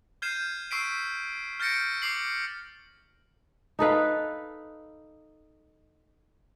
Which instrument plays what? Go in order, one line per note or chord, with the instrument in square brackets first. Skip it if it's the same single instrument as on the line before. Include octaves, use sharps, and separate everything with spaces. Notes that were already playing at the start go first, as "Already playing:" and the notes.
[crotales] F6 G6 G#6 C7 D#7 E7
C#6 E6 B6 C7 D7 D#7
F6 G6 A6 A#6 C#7 D7
D6 C7 F#7
[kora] D#4 A4 B4 F5